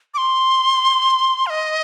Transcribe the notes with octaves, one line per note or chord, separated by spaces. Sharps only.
D6
C6
F5
D#5